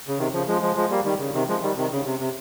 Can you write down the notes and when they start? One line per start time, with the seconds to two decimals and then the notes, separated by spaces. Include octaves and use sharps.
0.08 C#3
0.18 C3 D#3
0.33 C#3 F3
0.47 F3 G#3
0.62 F3 G#3
0.76 F3 G#3
0.90 G3 A#3
1.04 D#3 G3
1.20 C#3
1.33 C3 D#3
1.48 F3 G#3
1.62 D#3 G3
1.77 C3 D#3
1.91 C#3
2.06 C3
2.19 C3